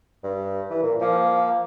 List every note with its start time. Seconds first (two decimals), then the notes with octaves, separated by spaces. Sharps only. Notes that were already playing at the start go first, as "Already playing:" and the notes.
0.24 G2
0.70 E3
0.83 A#2
1.01 F3 A#3